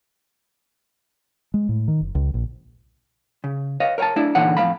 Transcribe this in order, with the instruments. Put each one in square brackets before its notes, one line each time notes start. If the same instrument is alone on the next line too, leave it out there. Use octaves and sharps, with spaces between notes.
[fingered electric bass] G#3
A2
D#3
F#1
C#2
A#1
[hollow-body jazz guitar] C#3
B4 C#5 D#5 F5
A#4 C#5 F5 G#5 A5
A3 D4 E4 D5 E5
A#2 D3 E3 D#4 C#5 F#5
F2 A2 A3 F5 B5